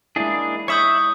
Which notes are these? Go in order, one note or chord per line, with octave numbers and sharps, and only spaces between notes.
G#3 A#3 D4 E4 G#4
C#5 E5 B5 C#6 D#6 G6